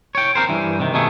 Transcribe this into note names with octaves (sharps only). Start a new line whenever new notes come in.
C#5 G5
C4 G#4 A#4 C5
G2 E3
C3 D#3
B2 D#3 A3 G#4